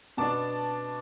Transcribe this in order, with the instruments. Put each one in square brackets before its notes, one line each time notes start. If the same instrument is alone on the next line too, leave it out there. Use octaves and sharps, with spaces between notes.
[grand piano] B2 B3 D4 A5 D6